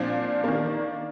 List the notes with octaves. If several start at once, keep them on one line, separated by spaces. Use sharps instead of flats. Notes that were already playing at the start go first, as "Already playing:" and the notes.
Already playing: A#2 F3 C4 D4
D#3 A#3